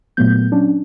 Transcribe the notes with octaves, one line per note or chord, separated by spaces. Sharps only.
A#2 F#3 A3 B3 G6
F#3 C#4 D4